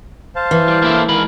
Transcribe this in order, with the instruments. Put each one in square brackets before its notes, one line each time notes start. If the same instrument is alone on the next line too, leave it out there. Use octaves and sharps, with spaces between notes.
[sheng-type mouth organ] C5 F5 A5
[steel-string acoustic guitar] E3
[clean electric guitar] G3
A#3 E4 A4
[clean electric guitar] G#3 A#4 B5 [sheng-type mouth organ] F5